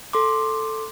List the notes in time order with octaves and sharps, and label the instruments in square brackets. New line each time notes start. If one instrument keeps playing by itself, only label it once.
[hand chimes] A4 C6 D6